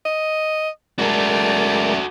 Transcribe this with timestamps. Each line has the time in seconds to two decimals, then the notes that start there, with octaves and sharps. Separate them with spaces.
0.06 D#5
0.99 F#2 G#3 A3 F#4 A4 A#4 D5